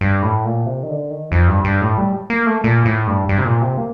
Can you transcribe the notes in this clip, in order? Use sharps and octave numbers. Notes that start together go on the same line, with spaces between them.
G2
A2
A#2
C3
D#3
D3
D#3
F2
G2
G2
A2
G3
A#3
A3
A#2
A2
G2
G2
C3
A#2
C3
A#3